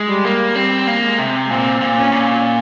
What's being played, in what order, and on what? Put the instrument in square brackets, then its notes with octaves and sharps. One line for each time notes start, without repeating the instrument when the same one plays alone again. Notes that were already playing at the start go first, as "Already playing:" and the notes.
Already playing: [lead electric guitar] G#3
[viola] G3
[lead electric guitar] A#3
[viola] G3 [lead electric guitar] C4
[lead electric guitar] A#3
[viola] G#3
[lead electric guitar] C3
[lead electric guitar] A#2 [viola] C4
[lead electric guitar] A#2
[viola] C#4
[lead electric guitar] A#2